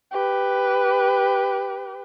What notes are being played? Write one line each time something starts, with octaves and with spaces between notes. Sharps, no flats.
G4 B4